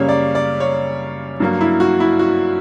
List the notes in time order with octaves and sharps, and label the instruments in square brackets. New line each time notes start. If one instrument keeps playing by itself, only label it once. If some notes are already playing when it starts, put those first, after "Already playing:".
Already playing: [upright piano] F#2 C#3 G3 A#3 C#5
D5
D5
C#5
G2 F#3 A#3
E4
F#4
E4
F#4